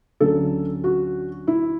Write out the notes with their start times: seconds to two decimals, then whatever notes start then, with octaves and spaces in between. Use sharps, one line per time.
0.20 D2 D3 F#3 C#4 A4
0.84 F#4
1.47 E4